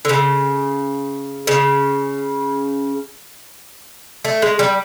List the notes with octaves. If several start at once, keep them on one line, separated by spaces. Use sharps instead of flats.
D3
C#3
C#3
A3
G#3
G3